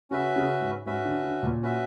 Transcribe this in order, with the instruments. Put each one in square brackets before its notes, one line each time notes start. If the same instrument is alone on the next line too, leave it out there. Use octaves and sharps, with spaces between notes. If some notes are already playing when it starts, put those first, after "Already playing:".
[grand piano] C#3 [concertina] C#4 F#4 B4 E5
[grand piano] C#3
G#2
[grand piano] G#2 [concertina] C#4 F#4 B4 E5
[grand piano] D3
D3
A#2
[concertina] C#4 F#4 B4 E5